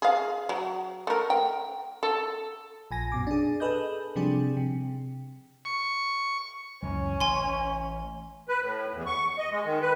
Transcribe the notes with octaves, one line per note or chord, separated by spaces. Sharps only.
G#4 F5
F#3
A3 A#4
G5
A4
A#1 G#5 A#6
F#2 B2 D6
D4 G#4
G#4 A4 B4 D#5 G6
C3 F3 G3 D4 G#4
C3
C#6
C#2 F#2 E3 C#4
A1 G#5 C6
B4
A2
E2
C#6
D#5
G#3
D#3
B4